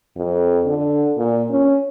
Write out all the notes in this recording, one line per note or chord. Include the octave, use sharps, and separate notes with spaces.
F2
D3
A#2
C#4